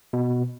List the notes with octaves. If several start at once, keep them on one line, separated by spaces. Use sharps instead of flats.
B2